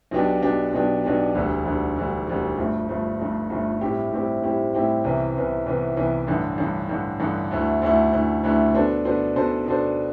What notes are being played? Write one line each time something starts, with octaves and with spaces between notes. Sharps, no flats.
B1 B2 B3 D4 G4
B1 B2 B3 D4 G4
B1 B2 B3 D4 G4
B1 B2 B3 D4 G4
E1 D2 D3 G3
E1 D2 D3 G3
E1 D2 D3 G3
E1 D2 D3 G3
G1 G2 F3 A3
G1 G2 F3 A3
G1 G2 F3 A3
G1 G2 F3 A3
A2 G3 C4 E4 G4
A2 G3 C4 E4 G4
A2 G3 C4 E4 G4
A2 G3 C4 E4 G4
C2 C3 E3 B3
C2 C3 E3 B3
C2 C3 E3 B3
C2 C3 E3 B3
A1 G2 D3
A1 G2 D3
A1 G2 D3
A1 G2 D3
D2 D3 A3 E4
D2 D3 A3 E4
D2 D3 A3 E4
D2 D3 A3 E4
B2 B3 D4 A4 C5
B2 B3 D4 A4 C5
B2 B3 D4 A4 C5
B2 B3 D4 A4 C5